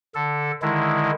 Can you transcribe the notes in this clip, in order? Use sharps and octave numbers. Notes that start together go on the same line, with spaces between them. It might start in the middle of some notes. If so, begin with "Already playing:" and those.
D3 A4
D3 D#3 G#3 E4